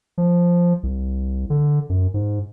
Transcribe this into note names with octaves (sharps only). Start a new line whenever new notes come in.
F3
C2
D3
F#2
G#2